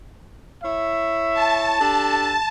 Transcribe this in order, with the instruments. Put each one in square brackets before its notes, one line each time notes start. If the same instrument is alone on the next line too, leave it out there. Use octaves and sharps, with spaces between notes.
[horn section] E4 C#5 E5
[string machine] A5
[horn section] D4 G4 A4